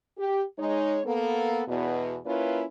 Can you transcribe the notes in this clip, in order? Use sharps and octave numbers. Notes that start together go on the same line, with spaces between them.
G4
G#3 D#4 C#5
A#3 B3 A4
E2 B2
A#3 C#4 E4 F4 B4 C#5